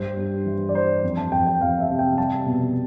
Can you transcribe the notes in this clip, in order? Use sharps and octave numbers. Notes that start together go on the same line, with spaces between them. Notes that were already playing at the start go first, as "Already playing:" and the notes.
Already playing: G2 C5
G2
E3
D5
G3 C5
F2
A5
F2 G5
G5
F2 F5
E5
C3
G5
G3 A5
B2